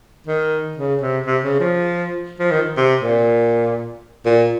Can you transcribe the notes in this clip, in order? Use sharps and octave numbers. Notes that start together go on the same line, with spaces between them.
D#3
C#3
C3
C3
C#3
F3
F3
D#3
C3
A#2
A#2